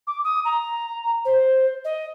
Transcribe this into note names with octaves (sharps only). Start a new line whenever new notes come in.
D6
D#6
A#5
C5
D#5